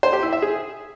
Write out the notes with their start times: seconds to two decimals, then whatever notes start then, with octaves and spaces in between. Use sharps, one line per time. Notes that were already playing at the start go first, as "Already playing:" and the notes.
0.03 C5
0.13 G4
0.23 E4
0.33 E5
0.42 G#4